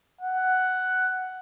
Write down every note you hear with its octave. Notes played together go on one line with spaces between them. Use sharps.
F#5